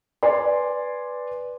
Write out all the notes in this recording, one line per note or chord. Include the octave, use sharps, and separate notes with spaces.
B4 D5 G#5 C6